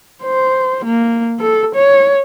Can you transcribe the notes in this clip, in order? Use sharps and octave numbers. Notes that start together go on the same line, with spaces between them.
C5
A#3
A4
C#5